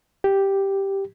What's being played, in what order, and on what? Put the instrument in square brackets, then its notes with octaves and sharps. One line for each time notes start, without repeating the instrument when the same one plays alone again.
[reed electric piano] G4